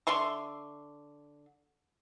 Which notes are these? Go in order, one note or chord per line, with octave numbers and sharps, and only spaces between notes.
D3 E5 C6 C#6